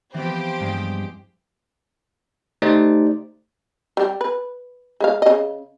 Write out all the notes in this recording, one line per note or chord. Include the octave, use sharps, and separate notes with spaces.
E3 F3 B3 C4 G4 C5
G2 G#3
A3 D#4 G4 C5 D5
G3 G4
B4
G#3 E4 F5
C#3 D#5